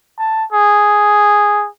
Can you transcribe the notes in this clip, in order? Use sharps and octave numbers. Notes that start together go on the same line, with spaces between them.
A5
G#4